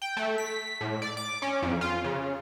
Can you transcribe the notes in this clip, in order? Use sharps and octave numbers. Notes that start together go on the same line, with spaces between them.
G5
A3
B6
A2
D5
D6
C#4
F2
F4
C#3